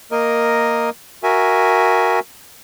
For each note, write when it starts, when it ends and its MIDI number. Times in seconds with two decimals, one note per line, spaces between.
0.12 0.90 58
0.12 0.90 70
0.12 0.90 75
1.23 2.20 66
1.23 2.20 70
1.23 2.20 76
1.23 2.20 80